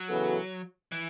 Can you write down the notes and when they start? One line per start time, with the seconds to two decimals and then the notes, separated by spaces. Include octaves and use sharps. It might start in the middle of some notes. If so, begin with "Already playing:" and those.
Already playing: F#3
0.08 C#3 E3 B3 F#4 A4
0.92 E3